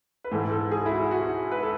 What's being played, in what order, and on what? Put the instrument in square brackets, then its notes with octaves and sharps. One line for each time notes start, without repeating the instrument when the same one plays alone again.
[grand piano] B4
G#2 E3 A4
A4
G#4
E4
F#4
F#4
B4
A4